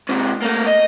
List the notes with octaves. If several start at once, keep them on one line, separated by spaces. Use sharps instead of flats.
G#2 C3
A3 A#3
D#5